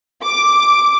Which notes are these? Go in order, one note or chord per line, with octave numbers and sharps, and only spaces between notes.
D6